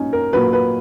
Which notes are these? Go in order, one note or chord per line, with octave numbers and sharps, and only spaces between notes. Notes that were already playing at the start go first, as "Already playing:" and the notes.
Already playing: A#2 F#3 C#4 D#4
A#4
A#2 F#3 B4
B4